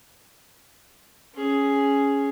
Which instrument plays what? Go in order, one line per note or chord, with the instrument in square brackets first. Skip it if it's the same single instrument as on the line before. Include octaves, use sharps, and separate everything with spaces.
[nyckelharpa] C#4 G#4